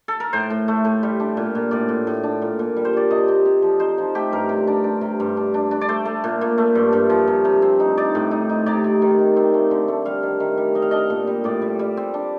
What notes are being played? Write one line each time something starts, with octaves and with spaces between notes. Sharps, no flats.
A4
A#4
A2 C5
A2
A3
A2
G3
D4
A#2
A#2
A2 D5
A2
A2
D4
A#2
A#2
G3
C5
G3 D5
C3 D#5
C3
C3
F3
D#4 C5
F3
A3 G4
G2 A#4
C3
D4
D4
C3
G2
D4
D4
D4
D5
A3 C5
A3
A#2
A#2
A3
G2
G2
F3
C3
C3
C4
D#4
D#4 D5
A2
D#4
D#4
C3 D5
C3
D#3
D#3
C4
A3
D3
A3
G3 F5
D#3
D#3
G3
G3 D#5
F5
D4 D#5
A#2
G3
A2 D5
G3
G3
C4
D4